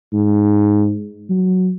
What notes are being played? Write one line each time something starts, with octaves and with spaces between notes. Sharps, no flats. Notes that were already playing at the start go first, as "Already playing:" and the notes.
G#2
F#3